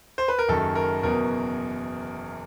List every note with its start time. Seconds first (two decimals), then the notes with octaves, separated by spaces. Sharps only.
0.18 C5
0.28 B4
0.39 A#4
0.48 F#1 F#2 D#3 A4
0.75 A#4
1.03 F#1 E2 B2 F#3 A#4